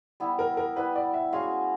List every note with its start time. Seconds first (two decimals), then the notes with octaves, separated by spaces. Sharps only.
0.20 G3 B3 E4
0.39 A#4
0.57 A#4
0.76 G3 B3 E4 G4 B4
0.95 D5
1.14 E5
1.32 G#3 C#4 F#4 F5